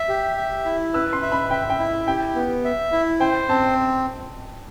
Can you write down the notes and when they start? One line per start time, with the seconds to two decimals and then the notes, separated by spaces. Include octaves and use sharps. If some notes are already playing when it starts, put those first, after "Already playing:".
Already playing: E5
0.09 G4
0.37 E5
0.65 E4
0.94 B4 E6
1.13 C6
1.23 E5
1.32 B5
1.50 E5 G5
1.70 G5
1.79 E4
2.07 G4 G5
2.35 B3
2.65 E5
2.92 E4
3.20 C5 G5
3.49 C4 A5